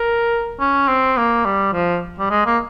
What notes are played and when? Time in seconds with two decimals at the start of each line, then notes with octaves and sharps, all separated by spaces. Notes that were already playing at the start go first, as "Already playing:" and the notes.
Already playing: A#4
0.59 C#4
0.88 C4
1.17 A#3
1.45 G3
1.73 F3
2.19 G3
2.30 G#3
2.46 A#3